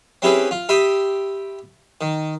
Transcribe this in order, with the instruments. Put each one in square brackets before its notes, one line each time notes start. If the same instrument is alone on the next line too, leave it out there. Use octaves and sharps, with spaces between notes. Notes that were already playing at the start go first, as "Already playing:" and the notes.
[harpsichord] C4 C#4 E4 G4 G#4 B4
F4
G4 E5 B5 C6 D#6
D#3